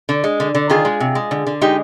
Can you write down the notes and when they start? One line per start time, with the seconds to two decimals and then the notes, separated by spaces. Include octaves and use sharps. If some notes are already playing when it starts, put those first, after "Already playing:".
0.09 D3
0.24 G#3
0.40 D3
0.55 D3
0.70 D#3 F4 G#4
0.85 G#3
1.00 C3
1.15 G#3
1.31 D3
1.47 D3
1.61 G#3 D#4 G4